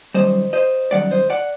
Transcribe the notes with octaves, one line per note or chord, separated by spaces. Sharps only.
F#2 D#3 G3 C5 D#5
C5 D#5
F#2 D#3 G3 D5 F#5
C5 D#5
D5 F#5